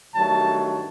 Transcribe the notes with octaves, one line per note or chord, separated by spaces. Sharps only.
G2 D#3 F#3 A3 A5